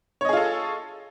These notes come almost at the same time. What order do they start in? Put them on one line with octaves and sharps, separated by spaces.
C#5 D#5 G#4 F4 A4